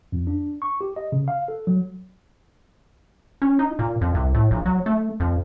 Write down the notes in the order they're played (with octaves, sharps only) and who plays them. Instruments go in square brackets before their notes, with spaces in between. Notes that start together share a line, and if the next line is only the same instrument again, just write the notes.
[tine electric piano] F2
D4
C#6
G4
D#5
C#3
F5
A4
F#3
[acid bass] C#4
D#4
A#2
F2
C2
A2
A#1
F#3
A3
F2